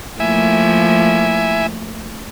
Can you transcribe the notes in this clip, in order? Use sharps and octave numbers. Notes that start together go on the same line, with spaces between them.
F3 A3 A#3 E4 E5 G#5